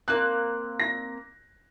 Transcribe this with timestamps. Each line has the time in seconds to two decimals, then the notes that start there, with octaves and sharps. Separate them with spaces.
0.08 A#3 C4 F#6
0.80 A#6